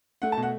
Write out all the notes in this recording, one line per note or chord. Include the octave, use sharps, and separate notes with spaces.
A3 F#5
A5
B2
F#5